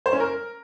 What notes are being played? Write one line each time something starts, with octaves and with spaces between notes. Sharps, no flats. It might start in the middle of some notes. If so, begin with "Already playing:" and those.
C5
C#4
A#4